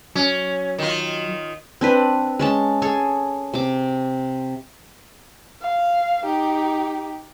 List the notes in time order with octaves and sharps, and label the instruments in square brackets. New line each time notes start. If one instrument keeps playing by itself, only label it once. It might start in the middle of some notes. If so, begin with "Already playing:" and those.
[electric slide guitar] F#3 [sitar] C#4
[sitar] D#3 F4
[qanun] C4 D4 B4
G#3 C#4 A5
G#4 A4 C#5
C3 D6
[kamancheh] F5
D#4 G4